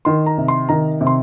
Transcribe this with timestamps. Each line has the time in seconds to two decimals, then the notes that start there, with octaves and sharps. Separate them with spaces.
0.05 D#3 C6
0.26 A#5
0.38 C3
0.48 C6
0.69 D#3 A#5
1.01 C3
1.07 C6